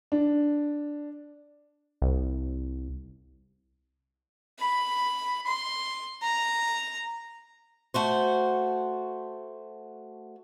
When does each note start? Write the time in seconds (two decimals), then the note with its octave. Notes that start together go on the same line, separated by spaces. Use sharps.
0.12 D4
2.02 C2
4.60 B5
5.47 C6
6.23 A#5
7.94 A3 F#4 C5